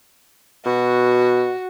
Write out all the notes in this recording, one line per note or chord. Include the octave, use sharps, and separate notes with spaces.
B2 F#4